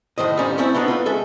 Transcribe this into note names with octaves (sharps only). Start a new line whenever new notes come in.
A2 D#3 C5 D#5
G3 A#3 C#4 D#4 C5
G3 A3 C4 C#4 E4
A3 B3 D4 D#4
F4 B4
G#3 A4 E5